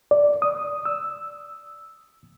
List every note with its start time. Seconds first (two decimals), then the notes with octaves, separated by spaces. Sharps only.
0.11 D5
0.42 D#6
0.85 E6